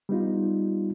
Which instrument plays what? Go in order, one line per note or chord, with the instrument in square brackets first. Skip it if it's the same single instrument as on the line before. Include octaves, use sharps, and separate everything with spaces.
[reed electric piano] G3 B3 D#4 F4